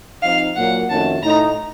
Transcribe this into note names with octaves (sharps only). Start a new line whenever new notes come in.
F3 C4 D#4 F5
A#2 F#3 A#3 F#5
F2 D#3 A3 C#4 F#4 A5
A2 A3 D#4 A#5